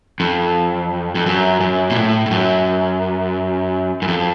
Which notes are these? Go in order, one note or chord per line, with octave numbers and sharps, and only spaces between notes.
F2
F2
F#2
F#2
A#2
A2
A2
F#2
F#2
F2